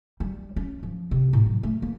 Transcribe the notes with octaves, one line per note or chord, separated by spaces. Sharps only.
G3
C#4
F3
C3
A2
F#3
A3
A#3